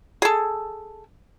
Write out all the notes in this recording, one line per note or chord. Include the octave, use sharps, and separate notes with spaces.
G#4 A4